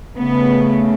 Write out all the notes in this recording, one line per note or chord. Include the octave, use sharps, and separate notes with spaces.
C#3 A3 B3